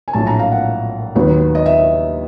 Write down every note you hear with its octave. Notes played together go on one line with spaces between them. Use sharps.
G#5
A#1 A2 F#3 A3 A5
A#5
F5
F#5
D#2 D#3 F#3 B3
D#5
E5